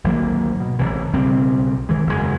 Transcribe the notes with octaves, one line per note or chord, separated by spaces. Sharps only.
G#1 D2 F#3 A#3
B2
A1 G#2 C3 E3
B1 C#3 G3 C4
D#3 E3 G#3
F#1 E2 G#2 G#3